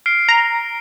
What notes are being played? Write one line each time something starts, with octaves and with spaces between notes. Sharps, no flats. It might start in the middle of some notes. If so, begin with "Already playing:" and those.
F6 C7 D7
A#5